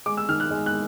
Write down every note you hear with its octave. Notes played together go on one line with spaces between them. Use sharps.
G#3 D6
E6
D#3 F6
F#6
G#3
F#6